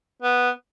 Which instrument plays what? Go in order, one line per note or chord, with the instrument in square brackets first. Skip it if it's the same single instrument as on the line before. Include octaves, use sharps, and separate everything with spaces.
[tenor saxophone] B3